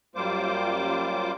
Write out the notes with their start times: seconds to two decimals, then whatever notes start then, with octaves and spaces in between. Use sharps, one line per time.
0.15 F#2 G3 A#3 F4 C5 D6